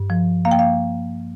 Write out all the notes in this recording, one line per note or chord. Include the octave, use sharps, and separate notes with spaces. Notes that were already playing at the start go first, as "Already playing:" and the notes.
Already playing: G2
F3
A#3 F5
G5
F5